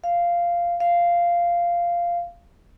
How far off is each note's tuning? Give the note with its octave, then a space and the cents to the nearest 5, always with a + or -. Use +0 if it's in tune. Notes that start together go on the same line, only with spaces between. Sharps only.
F5 -10
F5 -10